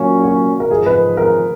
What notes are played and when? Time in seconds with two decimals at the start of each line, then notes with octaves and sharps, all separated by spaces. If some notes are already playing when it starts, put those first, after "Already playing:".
Already playing: A#2 F#3 A#3 C#4
0.23 F#4
0.60 A#4
0.70 G#2 F3 G#3 G#4
0.86 B4
1.17 A#4